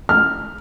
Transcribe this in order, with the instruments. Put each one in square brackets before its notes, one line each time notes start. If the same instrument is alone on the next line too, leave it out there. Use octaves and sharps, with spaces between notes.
[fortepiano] F6